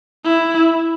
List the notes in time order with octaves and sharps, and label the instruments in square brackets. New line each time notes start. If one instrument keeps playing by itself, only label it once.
[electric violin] E4